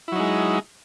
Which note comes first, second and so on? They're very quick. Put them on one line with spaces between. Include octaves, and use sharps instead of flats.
E4 F#3 D#4 G#3